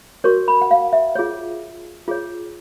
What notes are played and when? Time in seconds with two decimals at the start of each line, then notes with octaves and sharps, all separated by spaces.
0.24 F#4 A#4 C#5 C#6
0.48 B5
0.61 F#5
0.71 F5
0.93 E5
1.15 F4 G#4 C#5
2.08 F4 G#4 C#5